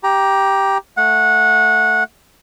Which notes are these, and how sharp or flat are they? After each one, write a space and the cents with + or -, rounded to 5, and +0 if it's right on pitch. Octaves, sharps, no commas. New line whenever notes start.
G4 +0 A#5 +20
A3 +0 F#5 -20